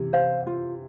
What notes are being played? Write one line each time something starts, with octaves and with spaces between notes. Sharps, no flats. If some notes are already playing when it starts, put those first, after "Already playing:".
Already playing: C3 E3
C5 F5
F4